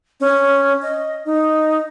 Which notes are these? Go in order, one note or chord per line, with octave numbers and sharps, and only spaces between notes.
C#4
D#5
D#4